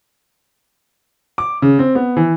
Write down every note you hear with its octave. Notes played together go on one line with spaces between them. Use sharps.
D6
C#3
C4
B3
E3